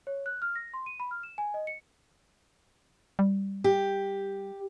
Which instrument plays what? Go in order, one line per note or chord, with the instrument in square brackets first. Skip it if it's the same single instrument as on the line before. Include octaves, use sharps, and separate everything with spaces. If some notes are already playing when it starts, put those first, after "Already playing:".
[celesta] C#5
F#6
F6
A#6
C6
D#7
B5
F6
E7
G#5
D#5
C#7
[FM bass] G3
[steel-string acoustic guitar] G4